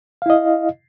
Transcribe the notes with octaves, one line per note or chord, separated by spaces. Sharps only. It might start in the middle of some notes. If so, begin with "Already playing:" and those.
E4 D#5 F5